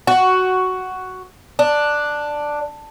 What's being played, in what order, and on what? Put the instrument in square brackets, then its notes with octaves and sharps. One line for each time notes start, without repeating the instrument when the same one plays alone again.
[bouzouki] F#4
D4